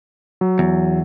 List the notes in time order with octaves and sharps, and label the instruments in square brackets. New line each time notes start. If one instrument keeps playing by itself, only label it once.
[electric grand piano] F#3
[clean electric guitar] E2